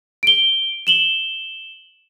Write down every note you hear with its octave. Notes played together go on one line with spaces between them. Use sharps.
D7 G7
E7 F#7 G7